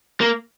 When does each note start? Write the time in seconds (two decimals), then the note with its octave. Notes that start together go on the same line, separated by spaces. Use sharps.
0.21 A#3